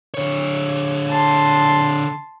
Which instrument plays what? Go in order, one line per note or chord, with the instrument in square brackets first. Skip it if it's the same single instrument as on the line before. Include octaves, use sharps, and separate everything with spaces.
[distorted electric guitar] D3 C#5
[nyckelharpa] A5 C6